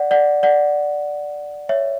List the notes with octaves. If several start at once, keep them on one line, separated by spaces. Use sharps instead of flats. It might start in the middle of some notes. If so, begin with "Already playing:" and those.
Already playing: D5 F#5
D5 F#5
D5 F#5
C#5 E5